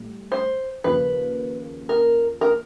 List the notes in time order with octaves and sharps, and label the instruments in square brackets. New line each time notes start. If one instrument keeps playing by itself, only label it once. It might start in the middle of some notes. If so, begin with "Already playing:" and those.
Already playing: [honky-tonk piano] A2 G3
[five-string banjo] C5
[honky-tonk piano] D#2 C#3 F3 [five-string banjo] B4
[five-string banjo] A#4
A#4